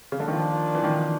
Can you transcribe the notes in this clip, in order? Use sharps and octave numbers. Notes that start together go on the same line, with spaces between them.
C#3
D3
D#3 F3 A#3 D4
E3
D#3